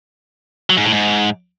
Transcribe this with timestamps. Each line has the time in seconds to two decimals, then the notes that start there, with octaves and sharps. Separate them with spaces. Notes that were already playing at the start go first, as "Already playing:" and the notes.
0.70 F#3
0.77 G#2
0.85 A2
0.93 G#2